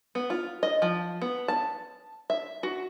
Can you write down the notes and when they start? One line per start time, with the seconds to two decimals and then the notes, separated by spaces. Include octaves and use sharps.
0.15 B3
0.30 F4
0.63 D#5
0.82 F3
1.22 B3
1.48 A5
2.30 E5
2.63 F#4